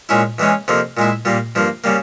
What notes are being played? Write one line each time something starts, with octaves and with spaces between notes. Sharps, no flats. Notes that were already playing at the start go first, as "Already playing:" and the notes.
A#2 G#3 C#4 E4
E2 E3 G#3 C#4
F2 C3 F3 A#3
A#2 G#3 E4
A#2 G3 A#3
G2 F3 A#3
C#3 G3 A#3